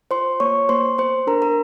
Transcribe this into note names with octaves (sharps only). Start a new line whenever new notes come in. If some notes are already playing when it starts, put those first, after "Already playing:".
F4 C5 C6
A#3 C#5 C#6
A#3 C5 C6
B3 C5 C6
D4 A#4 A#5
A#4 A#5